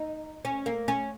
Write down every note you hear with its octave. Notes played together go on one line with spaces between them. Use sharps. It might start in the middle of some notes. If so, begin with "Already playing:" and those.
Already playing: D#4
C#4
A#3
C#4